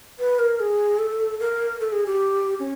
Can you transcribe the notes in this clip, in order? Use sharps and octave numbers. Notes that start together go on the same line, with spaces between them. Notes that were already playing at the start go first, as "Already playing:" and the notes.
B4
A#4
G#4
A4
A#4
A4
G#4
G4
C#4